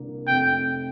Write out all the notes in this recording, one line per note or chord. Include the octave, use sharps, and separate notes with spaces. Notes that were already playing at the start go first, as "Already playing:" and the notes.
Already playing: C2 A#3 D4
F1 F2 C3 G5